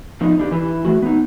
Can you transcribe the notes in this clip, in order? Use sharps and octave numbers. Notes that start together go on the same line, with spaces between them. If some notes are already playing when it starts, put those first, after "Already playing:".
F3 B3 D#4
D3 D4 G4
E3 E4
E3 A3 F#4
B3 D#4